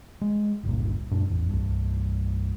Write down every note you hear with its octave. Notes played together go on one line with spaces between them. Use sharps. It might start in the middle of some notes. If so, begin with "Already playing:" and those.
G#3
G1 C#2 G2 A#2
F#2 A#2 G#3 D4
A1 E2
C2 G2